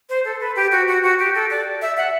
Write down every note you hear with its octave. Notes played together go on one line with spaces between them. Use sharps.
C5
A4
B4
G4
F#4
F#4
F#4
G4
A4
D5
E5
F#5